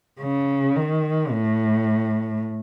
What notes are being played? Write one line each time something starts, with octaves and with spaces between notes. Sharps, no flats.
C#3
D#3
A2